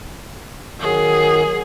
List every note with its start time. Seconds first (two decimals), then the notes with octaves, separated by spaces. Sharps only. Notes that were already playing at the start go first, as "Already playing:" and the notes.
0.80 D#3 F#3 G#4